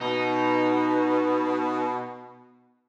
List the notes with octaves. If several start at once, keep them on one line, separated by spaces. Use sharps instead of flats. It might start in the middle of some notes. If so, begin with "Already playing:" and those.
B2 D#4